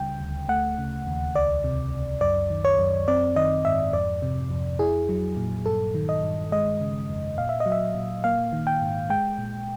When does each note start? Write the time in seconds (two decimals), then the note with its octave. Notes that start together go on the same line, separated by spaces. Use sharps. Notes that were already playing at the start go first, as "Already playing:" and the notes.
Already playing: C#2 C#3 G3 G5
0.20 D2
0.49 A3 F#5
0.78 C#3
1.07 D#2
1.36 C#2 D5
1.64 C3
1.92 C#2
2.21 F#2 D5
2.50 D#3
2.65 C#5
2.79 F#2
3.08 C4 D5
3.36 D#3 D#5
3.65 G#2 E5
3.93 F2 D5
4.22 C3
4.51 F2
4.79 E4 G#4
5.09 F#3
5.37 A#2
5.66 G2 A4
5.95 D#3
6.09 D#5
6.23 G2
6.52 G#3 D#5
6.81 C#3
7.09 F2
7.38 A#2 F5
7.49 E5
7.60 D#5
7.66 F#3
7.72 E5
7.95 A#2
8.24 A#3 F5
8.53 D#3
8.67 G5
8.82 G#2
9.10 G#3 G5
9.38 A#2